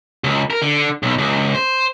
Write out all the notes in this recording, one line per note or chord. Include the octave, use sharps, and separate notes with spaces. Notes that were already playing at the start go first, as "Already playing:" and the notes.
C#2
A#4
D3
B1
C#2
C5